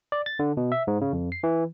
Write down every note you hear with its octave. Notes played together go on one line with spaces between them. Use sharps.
D5
A6
D3
B2
E5
G#2
C#3
F2
C7
E3